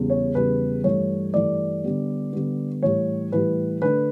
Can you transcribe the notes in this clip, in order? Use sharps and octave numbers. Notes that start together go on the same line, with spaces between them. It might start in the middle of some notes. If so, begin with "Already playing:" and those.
Already playing: E2 C#3 G3
C#5
E2 C#3 G3 B4
G2 E3 A3 C#5
G2 E3 A3 D5
D3 G3 B3
D3 G3 B3
A2 E3 G3 C#5
A2 E3 G3 B4
D3 A3 D4 B4